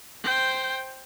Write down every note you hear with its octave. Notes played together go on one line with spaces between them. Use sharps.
C5 G5